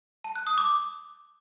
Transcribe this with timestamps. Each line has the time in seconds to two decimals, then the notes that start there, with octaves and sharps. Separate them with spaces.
0.24 A5
0.35 F#6
0.47 D#6
0.58 D6